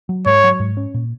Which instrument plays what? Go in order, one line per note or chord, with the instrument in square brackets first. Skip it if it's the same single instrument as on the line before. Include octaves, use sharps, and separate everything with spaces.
[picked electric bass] F#3
[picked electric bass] G#2 [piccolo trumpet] C#5
[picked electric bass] F#3
G#2
C#4
A#2